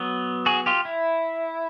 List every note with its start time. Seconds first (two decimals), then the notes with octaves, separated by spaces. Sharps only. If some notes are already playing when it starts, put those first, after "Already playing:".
Already playing: F#3 B3
0.46 F#4 G#4
0.66 F4 G4
0.85 E4